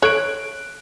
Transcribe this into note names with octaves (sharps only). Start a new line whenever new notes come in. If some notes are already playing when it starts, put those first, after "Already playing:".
A4 C#5 F#6 D7